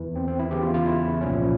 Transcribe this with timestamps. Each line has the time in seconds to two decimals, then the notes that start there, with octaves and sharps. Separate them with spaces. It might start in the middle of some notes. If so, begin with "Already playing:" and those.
Already playing: E2 E3
0.16 C4
0.28 C4
0.39 E4
0.51 E2 C#3 E3 G4
0.62 F4
0.74 F4
0.86 E4
1.21 C2 A#2 F3 C#4